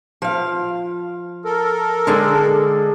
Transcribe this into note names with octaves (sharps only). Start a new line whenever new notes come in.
F3 F5
A4 A#4
D3 G#3 D4